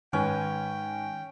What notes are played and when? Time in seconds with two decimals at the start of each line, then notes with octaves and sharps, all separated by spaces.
0.13 G#2 D#3 C#4 B4 G5 G#5